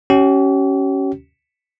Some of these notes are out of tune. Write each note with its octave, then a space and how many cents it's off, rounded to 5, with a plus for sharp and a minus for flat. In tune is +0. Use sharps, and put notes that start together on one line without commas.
C#4 +0 G4 -45